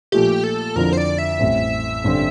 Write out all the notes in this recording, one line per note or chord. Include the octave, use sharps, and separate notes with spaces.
A#2 F3 A3 G4
A4
F2 D3 F3 C4 E4 A#4
C5
D5
E5
A1 A2 G3 C4
A1 G2 D3 A3 C4